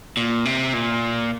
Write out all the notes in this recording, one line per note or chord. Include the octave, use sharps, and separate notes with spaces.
A#2
C3
A#2